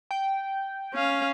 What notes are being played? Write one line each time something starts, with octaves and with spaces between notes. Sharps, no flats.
G5
C#4 F5